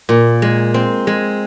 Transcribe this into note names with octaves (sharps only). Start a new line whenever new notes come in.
A#2
G#3
C4
G#3